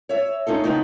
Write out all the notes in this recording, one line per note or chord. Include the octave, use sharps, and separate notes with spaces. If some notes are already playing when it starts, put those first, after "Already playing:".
C#5 E5
C#4 D#4 F4 A4
C#3 F3 B3 C4 D#4